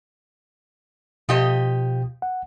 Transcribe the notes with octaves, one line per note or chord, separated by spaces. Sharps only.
B2 F3 G4 D#5
F#5